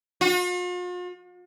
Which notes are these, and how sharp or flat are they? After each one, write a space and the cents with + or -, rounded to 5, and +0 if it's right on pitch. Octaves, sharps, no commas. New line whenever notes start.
F4 +45